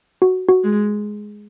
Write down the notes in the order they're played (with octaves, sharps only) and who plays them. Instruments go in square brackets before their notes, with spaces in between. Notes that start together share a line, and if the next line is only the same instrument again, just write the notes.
[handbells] F#4
F#4
[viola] G#3